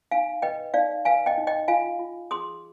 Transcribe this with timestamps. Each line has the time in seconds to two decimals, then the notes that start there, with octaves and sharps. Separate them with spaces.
0.11 D#4 F5 G#5
0.42 B4 D#5 G5
0.74 D#4 D5 F5
1.05 B4 F5 G#5
1.26 D#5 G5
1.37 D#4
1.47 D#5 G5
1.68 F4 F5 G#5
1.99 F4
2.31 G#4 C6 D#6